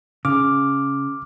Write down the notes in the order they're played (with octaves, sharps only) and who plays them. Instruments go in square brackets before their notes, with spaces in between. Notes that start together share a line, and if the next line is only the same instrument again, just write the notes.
[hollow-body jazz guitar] C#3 [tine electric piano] D6 F6